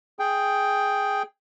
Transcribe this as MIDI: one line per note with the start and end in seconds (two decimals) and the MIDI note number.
0.19 1.23 68
0.19 1.23 79